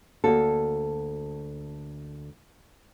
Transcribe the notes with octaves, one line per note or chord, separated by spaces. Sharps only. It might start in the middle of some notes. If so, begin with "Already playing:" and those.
D2 A#3 F#4 A4